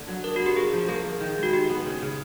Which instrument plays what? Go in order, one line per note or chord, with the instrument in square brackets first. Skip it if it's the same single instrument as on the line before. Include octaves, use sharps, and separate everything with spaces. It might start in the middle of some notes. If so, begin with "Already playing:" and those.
Already playing: [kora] D3 A#3
F#3
[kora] D4 [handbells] A#4
[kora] B3 [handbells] F#4
[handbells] G4
[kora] A#3 [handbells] G#4
[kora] F3
[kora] A#3 [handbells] G#4
[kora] A#3
D#3
G#3
[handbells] F#4
[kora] D#3 [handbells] G4
[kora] B3
C#3
C#3